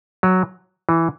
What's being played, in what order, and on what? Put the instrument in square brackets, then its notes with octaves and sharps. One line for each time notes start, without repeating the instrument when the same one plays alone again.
[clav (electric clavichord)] F#3
E3